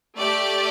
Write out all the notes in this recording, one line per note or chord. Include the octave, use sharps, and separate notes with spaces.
A3 G4 D5